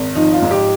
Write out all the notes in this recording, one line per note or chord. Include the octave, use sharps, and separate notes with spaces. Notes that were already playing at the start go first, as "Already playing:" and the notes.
Already playing: G#1
F3 D#4
F4
G#2
G4